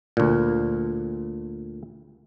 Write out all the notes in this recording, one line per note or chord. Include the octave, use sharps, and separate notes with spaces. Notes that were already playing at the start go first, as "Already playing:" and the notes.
D2 A#2